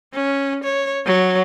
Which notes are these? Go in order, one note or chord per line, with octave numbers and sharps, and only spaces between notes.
C#4
C#5
F#3